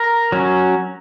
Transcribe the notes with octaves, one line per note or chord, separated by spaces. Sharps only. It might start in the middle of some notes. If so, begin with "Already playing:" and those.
Already playing: A#4
F#3 C#4